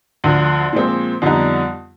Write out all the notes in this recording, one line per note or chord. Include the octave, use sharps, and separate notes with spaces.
D2 D3 F3
A#2 F3 G#3 C4
F2 D3 G3 B3 D#4